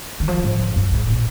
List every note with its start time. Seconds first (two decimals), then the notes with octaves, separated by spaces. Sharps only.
0.20 D#3
0.28 F3
0.44 G#2
0.59 F2
0.76 G2
0.92 G#2
1.07 A#2